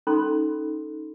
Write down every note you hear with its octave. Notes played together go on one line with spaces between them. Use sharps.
C#4 D#4 A4 B5 C6